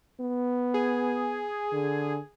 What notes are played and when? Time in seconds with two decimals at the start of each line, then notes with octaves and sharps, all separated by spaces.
0.20 B3
0.74 G#4
1.73 D3